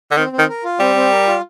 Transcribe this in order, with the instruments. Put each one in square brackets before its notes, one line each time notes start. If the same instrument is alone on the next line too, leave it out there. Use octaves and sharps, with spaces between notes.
[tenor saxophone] D3
[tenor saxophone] D#3 [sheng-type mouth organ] C4
[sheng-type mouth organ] C4
[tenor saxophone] D#3
[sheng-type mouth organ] A#4
F4
[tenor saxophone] G3 [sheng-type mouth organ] C4
[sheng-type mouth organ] C4
A#4
F4